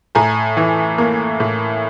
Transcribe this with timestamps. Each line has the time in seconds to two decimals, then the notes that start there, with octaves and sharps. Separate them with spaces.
0.15 A2 G#5 A#5
0.57 E3
0.98 A#3
1.40 A2